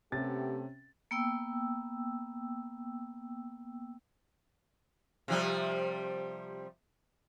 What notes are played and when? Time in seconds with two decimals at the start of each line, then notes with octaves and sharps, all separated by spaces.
0.12 C3 A3 B3 C#4 G4 A6
1.11 A#3 B3 G5 E6
5.28 C3 F3 G3